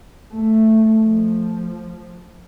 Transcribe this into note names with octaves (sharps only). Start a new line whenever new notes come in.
A3
F3